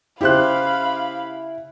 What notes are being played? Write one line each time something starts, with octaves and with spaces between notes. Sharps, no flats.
C#3 E4 G4 C5 F5 B5 F#6